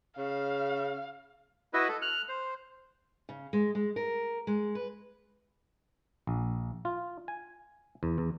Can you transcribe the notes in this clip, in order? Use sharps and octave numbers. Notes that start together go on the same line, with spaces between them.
C#3 F5
E4 F#4 B4 D#5 E5
A4
F6 F#6
C5
C#3
G#3
G#3
A#4
G#3
B4
A#1
F4
G#5
E2
E2